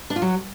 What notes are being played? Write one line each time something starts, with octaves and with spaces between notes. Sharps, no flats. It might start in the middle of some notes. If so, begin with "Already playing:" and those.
D4
F4
F#3